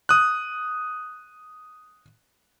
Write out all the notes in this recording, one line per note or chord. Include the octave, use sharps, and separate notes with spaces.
D#6 F#6